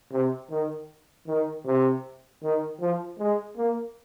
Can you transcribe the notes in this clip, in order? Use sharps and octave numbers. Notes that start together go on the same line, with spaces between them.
C3
D#3
D#3
C3
D#3
F3
G#3
A#3